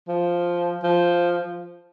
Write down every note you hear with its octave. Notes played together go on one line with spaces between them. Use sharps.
F3
F3